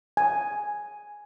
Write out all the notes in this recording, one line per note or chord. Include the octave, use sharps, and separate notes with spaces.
G#5